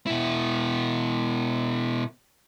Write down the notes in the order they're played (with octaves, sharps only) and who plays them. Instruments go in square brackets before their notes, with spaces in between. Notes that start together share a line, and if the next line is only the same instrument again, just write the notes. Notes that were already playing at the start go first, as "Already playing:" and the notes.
[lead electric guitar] B2 E4